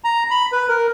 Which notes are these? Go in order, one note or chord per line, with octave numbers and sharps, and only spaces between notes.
A#5
B5
B4
A#4